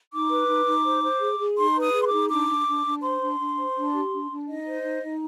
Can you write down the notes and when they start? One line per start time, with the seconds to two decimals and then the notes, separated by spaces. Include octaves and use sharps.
0.12 D#4 D6
0.29 B4
0.48 D#4
0.66 D#4
0.84 C5
1.02 C5
1.21 G#4
1.39 G#4
1.57 D#4 C6
1.76 B4
1.81 D#6
1.93 G#4
2.01 C6
2.06 D6
2.12 D#4
2.30 D4 D6
2.48 D4
2.66 D4
2.85 D4
3.02 C5 C6
3.20 D4
3.38 D4
3.57 C5
3.76 D4
3.93 G4
4.12 D4
4.30 D4
4.48 D#4 D#5
4.66 C5
4.84 D#4
5.03 D#4